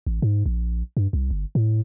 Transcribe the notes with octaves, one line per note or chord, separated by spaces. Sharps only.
A1
G#2
A#1
G2
C2
G1
A2